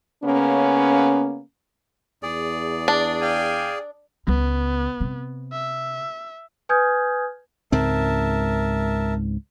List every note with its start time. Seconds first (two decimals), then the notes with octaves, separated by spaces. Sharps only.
0.24 C#3 A#3 B3 C#4
2.23 E2 G#4 D5
2.88 D4
3.21 F5 G5 G#5
4.27 C#2 B3
5.00 C3
5.52 E5
6.69 B4 G#5 D#6 F6 G6 G#6
7.72 C#2 G#2 C4 A#4 E5 A5